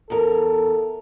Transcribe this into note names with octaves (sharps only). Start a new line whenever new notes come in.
E2 A4 A#4